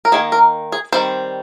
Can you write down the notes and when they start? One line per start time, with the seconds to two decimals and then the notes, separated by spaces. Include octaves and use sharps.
0.05 A#4
0.12 D#3 A#3 D#4 G#4
0.32 A#4
0.72 G#4
0.93 D#3 G3 C4 C5